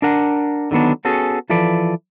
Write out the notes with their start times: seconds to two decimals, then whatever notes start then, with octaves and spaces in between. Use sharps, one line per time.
0.02 D4 A#4 F#5
0.71 D3 D#3 F#3 B3 D4
1.05 B3 C#4 F#4 G#4 A4
1.50 E3 F3 A4 B4 D5